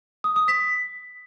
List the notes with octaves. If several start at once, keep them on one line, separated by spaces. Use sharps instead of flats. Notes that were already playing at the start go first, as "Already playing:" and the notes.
D#6
D#6
B6